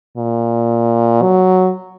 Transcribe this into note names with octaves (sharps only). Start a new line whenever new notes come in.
A#2
F#3